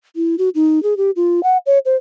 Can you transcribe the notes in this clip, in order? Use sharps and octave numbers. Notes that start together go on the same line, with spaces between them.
E4
F#4
D#4
G#4
G4
F4
F#5
C#5
C5